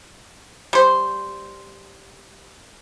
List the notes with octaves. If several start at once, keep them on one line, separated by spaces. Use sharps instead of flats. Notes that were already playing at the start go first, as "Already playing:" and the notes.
G3 C5